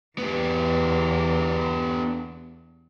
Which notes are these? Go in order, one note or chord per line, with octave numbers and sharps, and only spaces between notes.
E2 B3 G4